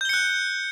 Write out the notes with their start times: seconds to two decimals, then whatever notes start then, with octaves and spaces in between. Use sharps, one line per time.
0.01 G6
0.05 G7
0.09 C#7
0.13 F#6